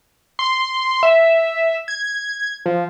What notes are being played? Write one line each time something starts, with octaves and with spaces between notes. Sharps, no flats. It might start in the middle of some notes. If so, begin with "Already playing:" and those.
C6
E5
G#6
F3